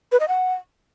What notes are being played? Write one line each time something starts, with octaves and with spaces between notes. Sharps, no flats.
B4
D#5
F#5